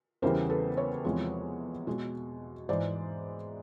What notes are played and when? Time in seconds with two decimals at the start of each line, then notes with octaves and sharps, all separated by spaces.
0.22 E2 C#3 E3 G3 A#4 C5
0.49 A4 B4
0.77 B4 C#5
1.04 E2 C3 F3 G#3
1.87 B2 G#3
2.69 G#2 E3 G#3 C5 D5